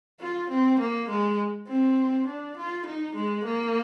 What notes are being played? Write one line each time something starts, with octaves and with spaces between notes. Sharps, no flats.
F4
C4
A#3
G#3
C4
D4
F4
D#4
G#3
A#3